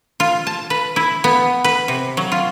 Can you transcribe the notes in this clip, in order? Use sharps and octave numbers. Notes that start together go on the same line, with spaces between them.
F4
A5
B4
E4
B3
B4
C3
F#3
F4